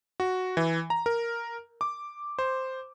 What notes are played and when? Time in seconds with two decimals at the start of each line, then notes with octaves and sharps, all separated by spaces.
0.20 F#4
0.57 E3
0.90 A#5
1.06 A#4
1.81 D6
2.39 C5